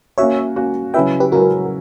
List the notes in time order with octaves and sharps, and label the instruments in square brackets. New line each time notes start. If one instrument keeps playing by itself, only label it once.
[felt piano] A#3 C#4 F#4 [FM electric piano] C#5 E5
[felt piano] A#3 C#4 F#4
[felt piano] C#3 F#3 C#4 E4 B4 [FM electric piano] E5 G5
[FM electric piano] G4 B4
[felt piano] C#3 F#3 C#4 E4 B4 [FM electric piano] F#4 A#4